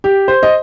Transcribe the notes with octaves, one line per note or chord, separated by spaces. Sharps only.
G4
C5
D#5